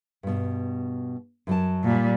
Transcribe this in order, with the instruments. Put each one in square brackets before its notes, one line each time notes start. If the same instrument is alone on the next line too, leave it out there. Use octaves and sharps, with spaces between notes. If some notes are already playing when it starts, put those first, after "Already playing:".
[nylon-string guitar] G2 B2
F#2 F#3 A5
[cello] A#2 G3